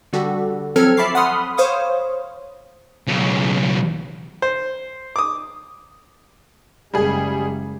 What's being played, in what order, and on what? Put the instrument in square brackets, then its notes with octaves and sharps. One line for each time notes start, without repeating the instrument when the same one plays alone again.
[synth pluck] D3 G3 F#4 G4 A4
F3 F#3 C4 A4 F6 G#6
E5 A5 B5 C#6 D6 C7
F#5 B5 C6 D#6 F6
C5 C#5 F5 C#6 D#6
[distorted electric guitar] B1 C#3
[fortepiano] C5
D6 D#6
[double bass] F#1 G#3 [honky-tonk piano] G3 G#4